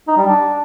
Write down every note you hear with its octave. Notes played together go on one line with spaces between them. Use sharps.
D#4
G3
D4